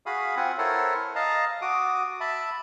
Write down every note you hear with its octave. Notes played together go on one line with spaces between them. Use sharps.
F#4 G#4 F5 B5 D#6
C4 F4 F#5 G#5
E4 A4 A#4 C5 C#5 F#5
D#5 F5 A5 A#5
F#4 D6 D#6
E5 A5 B5